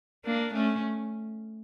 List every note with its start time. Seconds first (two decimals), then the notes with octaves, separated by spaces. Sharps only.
0.25 A#3 D4
0.53 A3 C#4